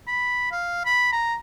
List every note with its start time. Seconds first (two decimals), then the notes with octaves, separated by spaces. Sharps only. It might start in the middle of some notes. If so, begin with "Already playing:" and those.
0.07 B5
0.52 F5
0.85 B5
1.12 A#5